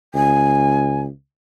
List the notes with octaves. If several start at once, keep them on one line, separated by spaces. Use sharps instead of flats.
C#2 G#5